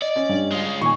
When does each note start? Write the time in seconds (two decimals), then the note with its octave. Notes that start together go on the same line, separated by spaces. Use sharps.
0.02 D5 D#5
0.16 C#4
0.29 G2
0.52 G#3 F4
0.81 D#2 A#2 D#3 G#5 C#6